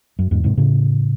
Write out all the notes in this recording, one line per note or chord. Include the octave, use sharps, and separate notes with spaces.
F#2
E2 G#2
G#2 C3
A2 C#3